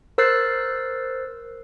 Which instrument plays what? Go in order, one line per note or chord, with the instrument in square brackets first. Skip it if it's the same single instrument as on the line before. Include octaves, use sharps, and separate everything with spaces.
[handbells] A#4 C5 E6 F#6 A6 C7